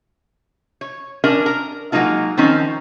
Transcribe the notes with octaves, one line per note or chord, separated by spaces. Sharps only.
C#5
C#4 D4 A#4 D5 D#5
A#4
F#3 G#3 A#3 D#4 F4
D#3 F3 C4 C#4 D#4